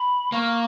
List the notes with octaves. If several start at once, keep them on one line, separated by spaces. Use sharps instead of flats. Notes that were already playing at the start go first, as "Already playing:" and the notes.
Already playing: B5
A#3 C#6